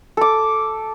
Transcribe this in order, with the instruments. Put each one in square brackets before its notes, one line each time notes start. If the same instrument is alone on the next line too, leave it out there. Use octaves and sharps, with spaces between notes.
[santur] A4 D6